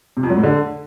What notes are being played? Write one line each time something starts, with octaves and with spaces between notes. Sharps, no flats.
C3
F2
F#3
A2
D3